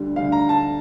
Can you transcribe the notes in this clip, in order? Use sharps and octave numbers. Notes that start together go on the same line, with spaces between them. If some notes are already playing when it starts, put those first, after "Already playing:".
Already playing: D2 D3 G3
D2 D3 G3 F5
A#5
A5